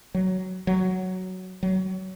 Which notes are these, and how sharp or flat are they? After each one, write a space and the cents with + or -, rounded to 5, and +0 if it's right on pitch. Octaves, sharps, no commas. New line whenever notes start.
F#3 +10
F#3 +5
F#3 +20